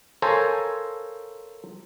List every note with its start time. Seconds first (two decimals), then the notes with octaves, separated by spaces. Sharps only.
0.22 A4 A#4 C5 C#5 F5 G#5